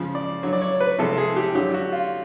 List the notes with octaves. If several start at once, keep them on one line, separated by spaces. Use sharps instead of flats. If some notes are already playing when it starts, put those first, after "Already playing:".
Already playing: C#3 F3 G#3
D5
D3 F#3 C#5
D5
C#5
B4
C3 F3 G#3 A4
G#4
G4
D3 F#3 G4
F#4
F4